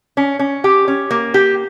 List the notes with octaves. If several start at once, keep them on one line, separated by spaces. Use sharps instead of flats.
C#4
C#4
G4
C#4
A#3
G4